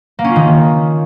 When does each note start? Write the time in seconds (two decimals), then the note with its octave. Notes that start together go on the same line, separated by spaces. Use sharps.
0.19 A#3
0.24 C#4
0.30 F4
0.36 D#3